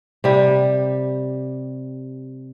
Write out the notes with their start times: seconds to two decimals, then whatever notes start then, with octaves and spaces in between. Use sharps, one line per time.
0.24 C3 G3